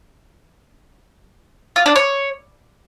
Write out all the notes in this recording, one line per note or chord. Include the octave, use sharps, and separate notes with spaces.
F4
D4
C#5